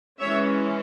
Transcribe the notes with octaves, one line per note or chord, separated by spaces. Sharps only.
E3 G#3 C#4 C#5 E5